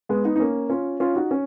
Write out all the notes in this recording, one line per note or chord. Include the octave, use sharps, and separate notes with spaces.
G#3 B3
B3 D#4
D#4
A#3 C#4
C#4 F4
C#4 F4
D#4 F#4
C#4